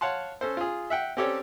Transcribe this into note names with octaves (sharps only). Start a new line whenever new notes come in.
C#5 F5 F#5 A5 C6
C#4 A4 C5
F4 G#4
E5 F#5 G5
C4 C#4 G4 A4 C#5 D5